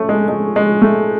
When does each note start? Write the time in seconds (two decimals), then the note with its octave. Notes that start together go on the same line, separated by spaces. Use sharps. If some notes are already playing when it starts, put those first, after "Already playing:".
Already playing: A3 C#4
0.09 G#3
0.28 G#3
0.56 G#3
0.82 A3